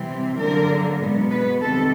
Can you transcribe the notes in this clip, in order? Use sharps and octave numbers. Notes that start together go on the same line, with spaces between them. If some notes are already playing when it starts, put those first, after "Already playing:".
Already playing: C3 E3 G3 C4
D3 F#3 A#3 A#4
B2 G#3 B3
B4
C3 D#3 G3 A4